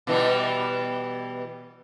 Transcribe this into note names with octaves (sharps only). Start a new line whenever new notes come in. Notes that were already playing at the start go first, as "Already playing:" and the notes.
B2 E3 G3